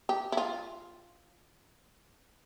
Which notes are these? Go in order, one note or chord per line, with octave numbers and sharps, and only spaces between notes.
G4
E4
F4